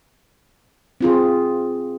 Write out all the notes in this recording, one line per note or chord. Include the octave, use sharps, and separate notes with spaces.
C4 F4 G#4